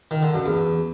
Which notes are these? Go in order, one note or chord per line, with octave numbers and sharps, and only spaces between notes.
D#3
D3
F#2
E2